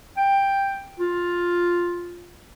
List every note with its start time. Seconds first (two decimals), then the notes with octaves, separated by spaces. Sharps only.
0.17 G5
1.00 F4